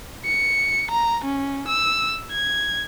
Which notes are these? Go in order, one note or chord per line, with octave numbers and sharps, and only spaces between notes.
C#7
A#5
C#4
E6
G#6